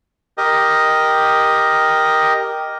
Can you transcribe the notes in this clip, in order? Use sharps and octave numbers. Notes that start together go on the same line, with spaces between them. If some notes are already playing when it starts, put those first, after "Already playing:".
G4 A#4 D#5